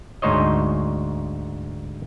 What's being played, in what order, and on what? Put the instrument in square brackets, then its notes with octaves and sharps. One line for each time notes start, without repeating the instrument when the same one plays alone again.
[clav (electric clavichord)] D2 G#2 D#4 C5 C#5 D#5